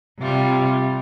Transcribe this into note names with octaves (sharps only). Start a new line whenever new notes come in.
C3 G3 F4